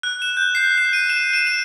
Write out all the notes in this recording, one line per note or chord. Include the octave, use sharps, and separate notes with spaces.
F#6
E7
G6
C7
E7
D#7
E7
D#7
E7